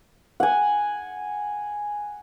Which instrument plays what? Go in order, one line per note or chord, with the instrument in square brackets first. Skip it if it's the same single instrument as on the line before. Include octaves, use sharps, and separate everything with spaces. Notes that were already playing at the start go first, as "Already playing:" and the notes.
[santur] F#5 G#5